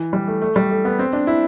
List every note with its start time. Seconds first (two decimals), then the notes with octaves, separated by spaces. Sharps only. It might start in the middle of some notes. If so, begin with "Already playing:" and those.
Already playing: E3
0.13 G3
0.27 A3
0.42 A3
0.56 G3
0.70 A3
0.85 B3
0.99 C4
1.13 D4
1.27 E4